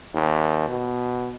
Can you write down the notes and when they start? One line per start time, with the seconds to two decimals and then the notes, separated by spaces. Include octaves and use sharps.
0.14 D#2
0.68 B2